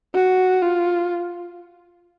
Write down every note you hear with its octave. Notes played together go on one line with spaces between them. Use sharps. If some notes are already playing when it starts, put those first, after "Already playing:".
F#4
F4